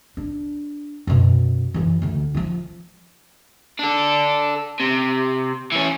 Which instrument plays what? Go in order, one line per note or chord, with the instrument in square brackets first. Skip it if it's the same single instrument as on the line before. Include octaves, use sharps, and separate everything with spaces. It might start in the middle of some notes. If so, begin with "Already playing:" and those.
[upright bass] D4
F#2 B2
F#2 E3
D2 D3
F3 F4
[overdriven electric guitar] D4 A4
C3
E3 C#4